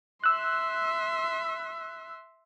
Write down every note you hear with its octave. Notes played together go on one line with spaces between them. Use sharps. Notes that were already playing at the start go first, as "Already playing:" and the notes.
E5 C6 E6 F#6